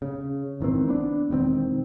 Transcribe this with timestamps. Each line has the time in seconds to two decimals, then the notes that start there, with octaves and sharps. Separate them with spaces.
0.02 C#3
0.60 G#1 D#3 E3 C4
0.89 B3 D4
1.30 E1 G2 D#3 C4